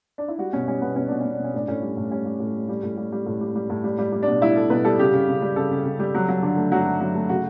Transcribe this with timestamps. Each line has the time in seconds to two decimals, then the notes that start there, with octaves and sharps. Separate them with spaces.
0.18 D4
0.28 E4
0.38 G3 F#4
0.53 B2 C#4
0.68 G3 C#4
0.82 B2 B3
0.96 B2 C#4
1.08 B2 D4
1.20 B2 C#4
1.33 D4
1.39 B2 C#4
1.54 A2 D4
1.68 A2 C#4
1.82 G3
1.97 A2
2.11 G3 C#4
2.26 G3
2.40 A2
2.55 G3
2.69 G3
2.83 A2
2.97 G3
3.12 G3
3.26 A2
3.41 G3
3.56 G3
3.70 A2
3.84 G3
3.98 G3
4.12 G3
4.23 B2 D4
4.41 G3 E4
4.56 G3 A4
4.70 B2 B4
4.85 G3 A4
4.99 C#3 G4
5.13 C#3
5.28 C#3
5.42 G3
5.56 C#3 A4
5.71 C#3
5.86 C#3
6.00 G3
6.14 F#3
6.29 F#3
6.43 D3
6.57 A3
6.72 F#3 F#4
6.86 A3
7.00 F#3
7.15 A3
7.29 C#3 F#4